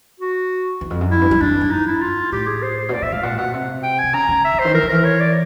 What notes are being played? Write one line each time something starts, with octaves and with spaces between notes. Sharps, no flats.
F#4
E2
F2
F#2
F2 E4
G2
F#2
F2 D4
G2
D#4
E4
F4
A2 G4
G#4
C5
C5
B2
A#2 D5
A2 E5
G#2 F5
A#2 F#5
B2 F#5
C3
G5
G#5
C3
C#3 A#5
C#3
E5
C#3
C5
D#3
E3 A#4
D#3
E3 A#4
C#5
D5